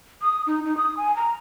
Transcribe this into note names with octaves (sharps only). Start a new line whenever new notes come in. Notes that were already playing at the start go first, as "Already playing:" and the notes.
D#6
D#4
D#4
D#6
G#5
A#5